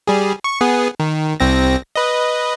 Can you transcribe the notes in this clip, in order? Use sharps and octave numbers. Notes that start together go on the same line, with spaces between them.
G3 G#4
C#6
B3 G#4
D#3
C2 C4 A#6
B4 D#5